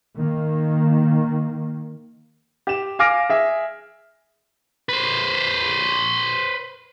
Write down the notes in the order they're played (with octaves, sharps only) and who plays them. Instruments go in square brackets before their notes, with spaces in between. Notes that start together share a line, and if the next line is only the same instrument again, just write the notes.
[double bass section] D#3 A#3
[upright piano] G4 E7
F5 G#5 D6 F6 A#6 D7
G#4 E5
[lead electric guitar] B4 C5